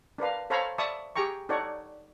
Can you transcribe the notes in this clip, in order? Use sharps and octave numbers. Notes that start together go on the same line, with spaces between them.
D4 A#4 B4 F5
A4 C5 C#5 F5 A#5 B5
D5 E5 A5 B5 C#6 D#6
G4 G#4 G5 A#5 C#6
D4 D#4 A4 C#5 D5 F#5